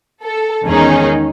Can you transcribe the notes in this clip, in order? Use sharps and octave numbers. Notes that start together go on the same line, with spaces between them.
A4
E2 D#3 G#3 C#4 D#4 G#4